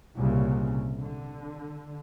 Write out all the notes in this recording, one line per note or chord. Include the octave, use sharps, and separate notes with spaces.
C2 A#2 C#3
D3